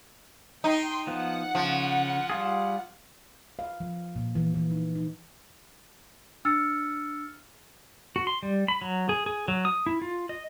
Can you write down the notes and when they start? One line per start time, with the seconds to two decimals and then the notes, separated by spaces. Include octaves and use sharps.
0.64 D#4 G5 C6
1.07 F3 B3 F#5
1.55 C#3 F3
2.30 G3 F4 G#4
3.59 F5
3.80 F3
4.16 A#2
4.35 E3
4.54 E3
4.71 D#4
4.95 D#4
6.45 D4 E6 F6 A6 C#7
8.16 F#4
8.27 C6
8.43 G3
8.68 B5
8.82 F#3
9.09 G#4
9.26 G#4
9.48 F#3
9.65 D#6
9.86 E4
10.02 F4
10.29 D#5